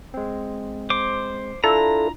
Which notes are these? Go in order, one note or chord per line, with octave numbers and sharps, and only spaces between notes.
G#3 C4
C5 D6
D4 E4 F4 A4 A#5